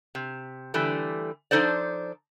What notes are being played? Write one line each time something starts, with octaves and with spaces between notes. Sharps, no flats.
C3
D3 E3 G3 A3
F3 D4 D#4 A4 C5 D5